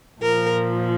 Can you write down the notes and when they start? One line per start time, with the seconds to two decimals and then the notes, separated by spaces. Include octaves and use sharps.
0.22 A#2 F3 A#4